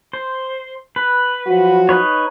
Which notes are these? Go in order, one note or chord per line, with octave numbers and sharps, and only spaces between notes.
C5
B4
F3 F#3 F#4
D#4 B4 C#5